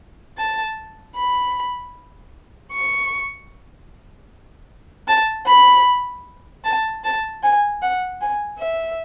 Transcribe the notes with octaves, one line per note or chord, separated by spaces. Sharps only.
A5
B5
C#6
A5
B5
A5
A5
G#5
F#5
G#5
E5